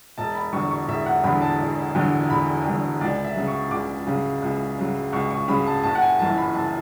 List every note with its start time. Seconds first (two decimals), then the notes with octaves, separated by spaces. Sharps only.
0.18 E1 A5
0.35 B5
0.53 E2 D3 F#3 C#6
0.71 C#6
0.88 E1 E5
1.06 F#5
1.24 E2 D3 F#3 B5
1.42 A5
1.59 E1
1.95 E2 D3 F#3
2.30 E1 B5
2.65 E2 D3 F#3
3.01 C#2 D5
3.24 E5
3.36 C#3 F#3
3.48 C#6
3.71 C#2 D6
4.07 C#3 F#3
4.42 C#2
4.78 C#3 F#3
5.12 C#2 C#6
5.31 C#6
5.48 C#3 F#3 B5
5.66 A5
5.83 F#1 A5
5.95 F#5
6.02 G#5
6.19 F#2 E3 A5
6.37 B5
6.54 F#1 A5